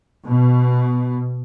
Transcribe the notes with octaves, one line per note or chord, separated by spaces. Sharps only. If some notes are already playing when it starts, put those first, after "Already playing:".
B2